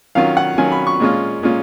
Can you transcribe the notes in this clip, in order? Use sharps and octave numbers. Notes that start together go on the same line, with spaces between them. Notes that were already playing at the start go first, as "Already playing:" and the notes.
D#3 F#3 C#4 F4 F5
F#5
D#3 F#3 C#4 F4 G#5
B5
C#6
A#2 G#3 C#4 F4
A#2 G#3 C#4 F4